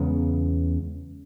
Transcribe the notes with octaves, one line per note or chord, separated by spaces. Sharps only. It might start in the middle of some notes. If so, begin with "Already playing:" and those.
Already playing: E2 C#3 G#3 B3